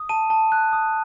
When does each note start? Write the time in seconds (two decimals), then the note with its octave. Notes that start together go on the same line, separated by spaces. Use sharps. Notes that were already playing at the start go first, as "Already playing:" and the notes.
Already playing: D#6
0.09 A5 D#7
0.30 A5
0.52 F#6
0.73 D#6